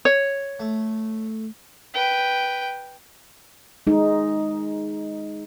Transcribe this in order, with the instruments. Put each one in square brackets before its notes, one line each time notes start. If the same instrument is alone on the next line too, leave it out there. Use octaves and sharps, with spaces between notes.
[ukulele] C#5
[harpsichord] A3
[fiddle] B4 G5
[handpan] G#3 D#4